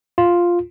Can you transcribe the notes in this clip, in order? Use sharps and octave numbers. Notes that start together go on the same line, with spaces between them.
F4